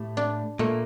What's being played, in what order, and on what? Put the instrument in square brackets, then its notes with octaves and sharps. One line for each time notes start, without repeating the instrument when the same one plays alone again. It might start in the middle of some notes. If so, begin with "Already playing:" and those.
Already playing: [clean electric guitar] A2 A3 [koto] G4
[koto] D4
[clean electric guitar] A#2 A#3 [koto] A3